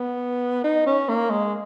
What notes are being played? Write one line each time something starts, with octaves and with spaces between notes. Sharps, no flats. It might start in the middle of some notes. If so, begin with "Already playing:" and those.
Already playing: B3
D#4
C#4
A#3
G#3